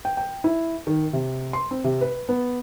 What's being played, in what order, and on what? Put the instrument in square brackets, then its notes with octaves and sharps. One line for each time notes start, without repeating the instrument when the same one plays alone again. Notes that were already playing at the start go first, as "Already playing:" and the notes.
[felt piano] G5
G5
E4
D#3
C3
C6
C4
C3
B4
B3